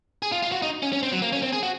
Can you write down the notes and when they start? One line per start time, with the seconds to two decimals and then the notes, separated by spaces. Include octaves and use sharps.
0.22 G#4
0.32 F4
0.43 F4
0.52 F#4
0.62 D#4
0.83 C#4
0.93 C#4
1.03 C4
1.12 F#3
1.22 A#3
1.33 C#4
1.42 C4
1.53 G#4
1.63 F#4